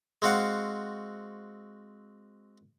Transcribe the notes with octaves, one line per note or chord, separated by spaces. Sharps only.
G#3 C4 F#4 F5 F#5